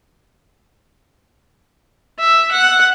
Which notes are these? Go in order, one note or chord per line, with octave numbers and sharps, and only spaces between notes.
E5
F#5